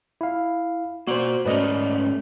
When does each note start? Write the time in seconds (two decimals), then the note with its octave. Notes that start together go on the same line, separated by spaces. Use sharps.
0.21 E4 F5
1.07 A#3 F#4 C5 D5
1.45 G#2 A3 C#4 B4 D5 D#5